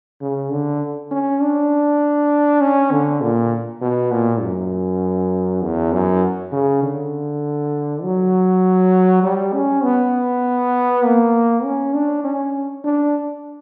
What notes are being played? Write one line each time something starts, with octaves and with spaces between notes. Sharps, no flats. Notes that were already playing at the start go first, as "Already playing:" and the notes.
C#3
D3
C#4
D4
C#4
D3
A#2
B2
A#2
F#2
E2
F#2
C#3
D3
F#3
G3
C#4
B3
A#3
C#4
D4
C#4
D4